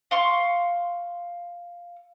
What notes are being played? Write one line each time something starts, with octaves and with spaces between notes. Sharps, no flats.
F5 C6 C#6